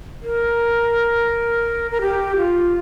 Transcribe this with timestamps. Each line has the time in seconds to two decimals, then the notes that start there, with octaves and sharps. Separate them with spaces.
0.23 A#4
1.91 A#4
2.01 G4
2.37 F4